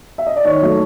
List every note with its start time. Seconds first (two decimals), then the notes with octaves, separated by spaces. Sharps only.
0.18 E5
0.27 D#5
0.36 D5
0.45 D#3 C#5
0.62 F#3 A3